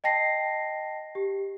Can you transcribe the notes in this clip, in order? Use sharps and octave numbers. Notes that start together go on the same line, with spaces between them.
D#5 G5 A5 A#6 C7
G4